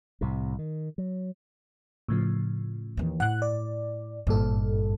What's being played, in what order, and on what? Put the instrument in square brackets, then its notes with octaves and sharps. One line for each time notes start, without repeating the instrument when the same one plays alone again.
[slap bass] C2 A2 C3
D#3
F#3
[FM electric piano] A2 C#3 F3
[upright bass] D#2 E3
[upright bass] A2 [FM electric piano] F#5 F#6
[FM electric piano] D5
[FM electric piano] G#1 A#2 A4 [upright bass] G2